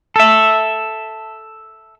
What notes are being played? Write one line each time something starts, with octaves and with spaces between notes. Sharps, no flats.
A4 E5